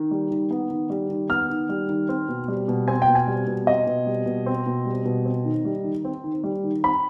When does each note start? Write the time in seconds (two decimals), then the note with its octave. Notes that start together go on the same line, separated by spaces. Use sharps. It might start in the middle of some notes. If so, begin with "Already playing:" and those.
Already playing: D#3
0.11 G3
0.31 D#3
0.51 B3
0.70 D#3
0.90 G3
1.10 D#3
1.30 B3 F6
1.50 D#3
1.69 G3
1.89 D#3
2.09 C4
2.29 B2
2.48 G3
2.68 B2
2.88 C4 G#5
3.02 G5
3.08 B2
3.15 G#5
3.27 G3
3.47 B2
3.67 C4 D#5
3.87 B2
4.07 G3
4.26 B2
4.46 C4
4.66 B2
4.86 G3
5.05 B2
5.25 C4
5.45 D#3
5.65 G3
5.84 D#3
6.05 C4
6.24 D#3
6.44 G3
6.64 D#3
6.84 C4 B5